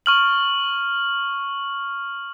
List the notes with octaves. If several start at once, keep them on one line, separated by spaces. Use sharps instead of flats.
C#6 F6 F#7